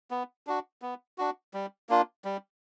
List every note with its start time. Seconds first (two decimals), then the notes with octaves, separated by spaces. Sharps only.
0.11 B3
0.47 D4 F#4
0.82 B3
1.18 D4 F#4
1.54 G3
1.89 A#3 D4 F4
2.25 G3